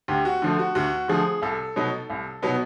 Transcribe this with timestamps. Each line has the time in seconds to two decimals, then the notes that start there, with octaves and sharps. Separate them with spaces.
0.08 D2 G4
0.25 F#4
0.42 D3 F3 A3
0.59 F#4
0.75 D2 F#4
1.08 D3 F3 A3 G#4
1.42 C2 A4
1.76 B2 F#3 B3 D#4
2.10 C2
2.42 B2 F#3 B3 D#4